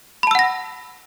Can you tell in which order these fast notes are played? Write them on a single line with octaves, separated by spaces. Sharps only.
B5 A5 E6 F#5 A#6